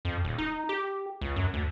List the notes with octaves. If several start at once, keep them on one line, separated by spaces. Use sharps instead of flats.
F2
D#1
D#4
G4
C#2
F#2
D2